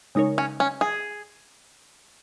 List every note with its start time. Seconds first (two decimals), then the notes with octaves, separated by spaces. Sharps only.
0.15 C#3 G#3 D#4 A#4 C#5
0.38 C#4
0.60 C#4
0.81 G#4